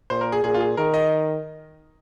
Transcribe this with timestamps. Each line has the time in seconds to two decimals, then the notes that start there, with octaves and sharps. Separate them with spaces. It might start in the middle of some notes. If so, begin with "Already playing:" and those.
0.10 A#2 C5
0.21 A#4
0.32 G#4
0.44 A#2 G#4
0.54 F4
0.60 G#4
0.77 D#3 A#4
0.94 D#5